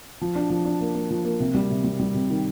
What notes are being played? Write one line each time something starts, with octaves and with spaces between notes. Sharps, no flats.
F3
D4
F3
D4
A#3
A#3
F3
A#3
C3
G3
C3
G3
G3
C3
D#3